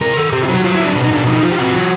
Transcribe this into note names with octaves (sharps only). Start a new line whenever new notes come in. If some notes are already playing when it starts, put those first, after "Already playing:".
C3 A#4
D#3 A4
C3 G4
F4
F#3
F#4
F#3 F4
E4
F#3
D4
B2 D4
D#4
B2 D4
F3 D#4
F3 F4
G4
C3 F#4
F3